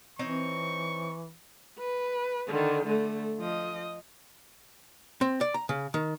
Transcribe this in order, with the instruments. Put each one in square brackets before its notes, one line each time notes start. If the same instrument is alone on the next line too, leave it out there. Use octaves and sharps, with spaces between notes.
[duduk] E3 [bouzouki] C4 D#4 C#5 [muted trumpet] C#6
[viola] B4
D3 D#3
D3 A3
F3 D#5
[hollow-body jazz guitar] C4
D5
A#5
C#3
D#3